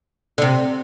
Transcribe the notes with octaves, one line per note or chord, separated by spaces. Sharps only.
D3
C3